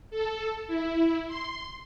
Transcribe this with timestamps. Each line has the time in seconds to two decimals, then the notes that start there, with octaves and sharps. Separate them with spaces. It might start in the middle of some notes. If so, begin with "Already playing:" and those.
0.10 A4
0.67 E4
1.27 C6